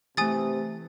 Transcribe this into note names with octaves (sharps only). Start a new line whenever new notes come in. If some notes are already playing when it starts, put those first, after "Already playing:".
C3 E3 A3 G#5 D#6 A6